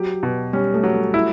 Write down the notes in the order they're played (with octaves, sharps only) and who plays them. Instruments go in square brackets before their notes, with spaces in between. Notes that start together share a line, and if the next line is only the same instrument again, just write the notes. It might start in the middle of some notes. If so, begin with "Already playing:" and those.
Already playing: [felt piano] F#3 [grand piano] G4
[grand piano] B2
[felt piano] G3 [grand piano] C#4
[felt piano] A3
[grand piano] F#3
[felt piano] A3
[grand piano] E4